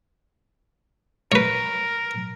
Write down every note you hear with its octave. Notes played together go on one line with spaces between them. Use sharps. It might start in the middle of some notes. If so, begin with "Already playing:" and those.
A#4 B4 C#5